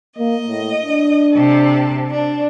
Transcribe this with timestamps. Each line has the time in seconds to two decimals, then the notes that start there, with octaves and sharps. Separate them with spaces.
0.19 A#3 D#5
0.48 A2
0.83 D4
1.33 C3 A4
2.10 D4